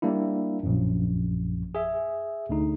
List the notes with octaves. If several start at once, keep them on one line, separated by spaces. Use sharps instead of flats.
G3 A#3 D4 E4
A#1 F#2
G#4 E5
D2 D3 D#4